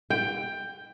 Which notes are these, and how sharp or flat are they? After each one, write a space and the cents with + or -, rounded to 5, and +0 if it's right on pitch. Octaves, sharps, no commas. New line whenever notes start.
G5 +10